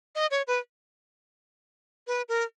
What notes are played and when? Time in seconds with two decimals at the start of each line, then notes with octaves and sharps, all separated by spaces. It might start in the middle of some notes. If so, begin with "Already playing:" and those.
0.15 D#5
0.31 C#5
0.47 B4
2.07 B4
2.29 A#4